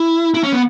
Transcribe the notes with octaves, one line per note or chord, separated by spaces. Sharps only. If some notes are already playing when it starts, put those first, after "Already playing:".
Already playing: E4
E4
C#4
B3